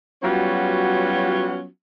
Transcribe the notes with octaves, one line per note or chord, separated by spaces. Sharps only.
F#3 G3 B3 C#4 F4 F#4